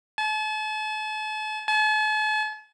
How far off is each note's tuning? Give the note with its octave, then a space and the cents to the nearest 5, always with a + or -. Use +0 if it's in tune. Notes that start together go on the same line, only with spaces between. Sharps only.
A5 -40
A5 -45